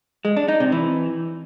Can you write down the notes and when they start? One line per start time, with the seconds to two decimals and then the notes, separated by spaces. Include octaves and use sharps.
0.25 G#3
0.37 D4
0.48 D#4
0.60 C3
0.72 E3